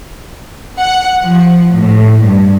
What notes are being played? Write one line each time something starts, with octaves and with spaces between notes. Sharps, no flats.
F#5
F3
A2
G2